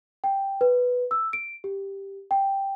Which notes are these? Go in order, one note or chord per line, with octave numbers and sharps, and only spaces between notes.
G5
B4
E6
D7
G4
G5